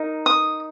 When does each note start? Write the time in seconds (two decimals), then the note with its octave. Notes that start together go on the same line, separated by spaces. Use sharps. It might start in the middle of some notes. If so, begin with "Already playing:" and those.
Already playing: D#4 A#4
0.26 D#6